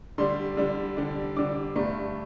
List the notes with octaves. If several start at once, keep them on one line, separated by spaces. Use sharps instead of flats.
D3 G3 D4 C6
D3 G3 D4
D3 G3 D4
D3 G3 D4 D6
G2 D3 A3 D4 A#5